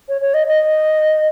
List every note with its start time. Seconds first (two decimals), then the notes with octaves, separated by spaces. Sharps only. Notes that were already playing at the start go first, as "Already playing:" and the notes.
0.09 C#5
0.21 C#5
0.34 D#5
0.47 D#5